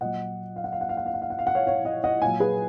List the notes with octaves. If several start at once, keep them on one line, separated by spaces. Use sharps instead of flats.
A#2 F#3 D#5 F#5
F5
F#5
F5
F#5
F5
F#5
F5
F#5
F5
F#5
F5
F#5
C#5 F5
C#5 F5
D#5 F#5
D#5 F#5
A#2 F#3 F5 G#5
G#4 B4